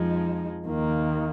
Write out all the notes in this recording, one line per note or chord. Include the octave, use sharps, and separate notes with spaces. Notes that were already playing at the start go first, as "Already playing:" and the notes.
Already playing: F2 F3 G#3 D#4
D#2 D#3 A#3